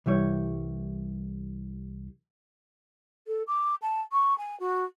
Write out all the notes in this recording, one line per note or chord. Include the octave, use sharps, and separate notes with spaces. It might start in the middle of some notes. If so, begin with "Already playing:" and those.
C2 E3 G3 C#5
A4
D6
A5
C#6
G#5
F#4